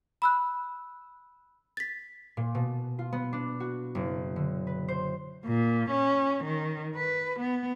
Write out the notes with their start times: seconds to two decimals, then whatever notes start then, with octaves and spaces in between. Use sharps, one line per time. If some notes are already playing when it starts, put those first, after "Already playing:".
0.22 B5 E6 F#6
1.77 A6 B6
2.37 A#2
2.55 B2
2.99 F4
3.12 B3
3.33 D4
3.60 F#4
3.95 F#1
4.36 D3
4.67 B4
4.88 C5
5.46 A#2
5.91 C#4
6.44 D#3
6.96 B4
7.40 B3